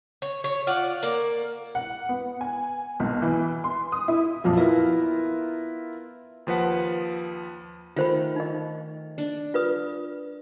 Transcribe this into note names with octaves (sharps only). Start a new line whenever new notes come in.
C#5
C#5
F4 D5 F#5
A#3 D5
F#5
B3
G#5
B1
E3
C6
D#6
E4
F2 A#2 F3 F#3
B3 E4 F4 A#4
D#2 F3 B4 F#5
D#3 A3 F4 C5 B5
D#4 D#5
D4
F4 B4 D#6